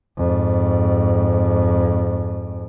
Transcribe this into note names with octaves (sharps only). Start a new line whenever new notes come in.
F2 G#2